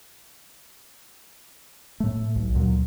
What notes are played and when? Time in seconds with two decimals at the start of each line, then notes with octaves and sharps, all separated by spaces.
2.00 A2 A3
2.36 B1
2.55 D2 A#2 F#3